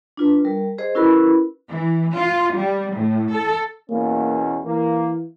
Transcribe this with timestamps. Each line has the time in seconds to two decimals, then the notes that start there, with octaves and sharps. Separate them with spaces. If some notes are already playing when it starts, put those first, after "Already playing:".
0.17 D4 F4 B4
0.45 G3 A#4
0.78 G#4 C5 D#5
0.95 C#4 E4 F#4 A#4 B4 B5
1.71 E3
2.14 F4
2.56 G3
2.93 A2
3.30 A4
3.90 E2 B2 A#3 C#4
4.64 E3 A#3